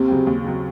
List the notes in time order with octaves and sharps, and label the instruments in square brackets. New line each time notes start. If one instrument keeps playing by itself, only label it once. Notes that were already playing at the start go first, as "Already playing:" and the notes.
Already playing: [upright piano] D#2 [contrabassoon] C3
[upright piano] C#3 F#3 C4
D#2
C#3 F#3 C4